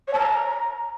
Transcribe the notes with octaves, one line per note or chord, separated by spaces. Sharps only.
C#5
A5
A#5